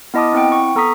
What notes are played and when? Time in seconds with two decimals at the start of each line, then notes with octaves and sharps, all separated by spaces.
0.14 B3 E4 D#5 A5 D6 D#6
0.33 C4 E4 F#5 G5
0.52 C#6
0.75 B3 A4 A#5 C#6 D#6 B6